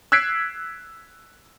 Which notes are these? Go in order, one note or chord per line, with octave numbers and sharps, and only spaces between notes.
E6 F#6 G#6 B6 C7 D7